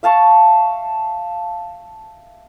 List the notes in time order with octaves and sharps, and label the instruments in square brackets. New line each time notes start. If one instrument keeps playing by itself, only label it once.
[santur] E5 F5 A5 C#6